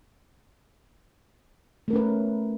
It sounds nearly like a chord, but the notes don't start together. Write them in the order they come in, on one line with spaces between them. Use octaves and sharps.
A3 A#4 C#4 B4